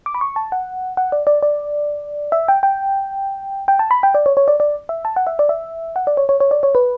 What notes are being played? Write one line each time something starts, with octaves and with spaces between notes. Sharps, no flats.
D6
B5
C#6
A5
F#5
F#5
D5
D5
D5
E5
G5
G5
G5
A5
B5
G5
D5
C#5
C#5
D5
D5
E5
A5
F#5
E5
D5
E5
F#5
D5
C#5
C#5
C#5
D5
C#5
B4